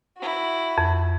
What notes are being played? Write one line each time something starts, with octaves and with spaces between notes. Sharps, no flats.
E4 F#4
F2